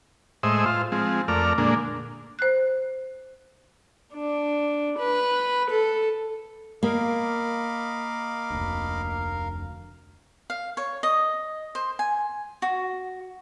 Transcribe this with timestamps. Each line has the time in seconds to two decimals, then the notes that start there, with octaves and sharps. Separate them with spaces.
0.43 A2 G#3 C5 D#5 E5
0.66 F4 C5
0.92 F3 G#3 C4
1.28 F2 A3 A#4 D5 F6
1.58 A#2 D3 G#3 A#3 D4
2.39 C5 F#6
4.14 D4
4.99 B4
5.71 A4
6.83 A#3 A#4 D#5 F5 B5 D6
8.51 F1 D2
10.50 F5
10.77 C#5
11.03 D#5
11.75 C5
11.99 G#5
12.62 F#4